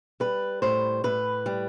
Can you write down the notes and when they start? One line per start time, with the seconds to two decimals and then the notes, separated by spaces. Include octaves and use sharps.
0.20 G3 B4
0.62 A2 C5
1.04 A2 B4
1.46 G3